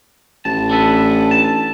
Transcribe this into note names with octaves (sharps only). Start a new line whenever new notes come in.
A1 A5
D4 A4 B4
A5